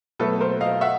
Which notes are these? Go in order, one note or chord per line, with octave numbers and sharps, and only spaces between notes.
B2 F#3 A3 A4 B4
A#4 C5
D#5 F5
E5 F#5